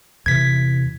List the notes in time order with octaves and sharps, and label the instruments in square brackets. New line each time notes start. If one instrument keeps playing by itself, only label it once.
[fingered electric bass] E2 C3 E3 [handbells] G#6 B6